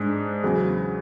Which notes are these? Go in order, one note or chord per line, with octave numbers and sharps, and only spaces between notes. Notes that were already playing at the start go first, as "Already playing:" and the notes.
Already playing: G#2 G#3 D4
E2 C#3 F#3